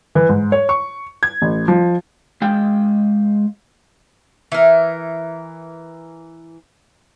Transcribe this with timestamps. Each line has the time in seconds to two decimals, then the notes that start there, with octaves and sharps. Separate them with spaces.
0.15 E3
0.29 G#2
0.52 C#5
0.69 C#6
1.23 G#6
1.42 A1
1.68 F3
2.42 G#3 F5 G5
4.52 E3 A#4